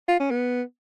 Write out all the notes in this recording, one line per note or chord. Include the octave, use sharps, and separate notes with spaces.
F4
C#4
B3